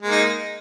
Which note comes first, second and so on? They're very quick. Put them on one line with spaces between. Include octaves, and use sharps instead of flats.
G#3 A#3 D#4